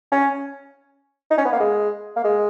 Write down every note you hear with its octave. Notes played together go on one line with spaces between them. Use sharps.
C#4
D#4
C#4
B3
A#3
G#3
A#3
G#3